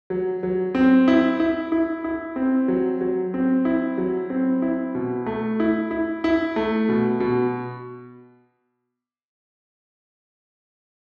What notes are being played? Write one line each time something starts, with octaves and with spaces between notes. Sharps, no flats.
F#3
F#3
C4
E4
E4
E4
E4
C4
F#3
F#3
C4
E4
F#3
C4
E4
B2
A3
E4
E4
E4
A3
B2
B2